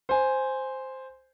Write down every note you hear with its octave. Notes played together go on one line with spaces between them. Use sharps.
C5 G#5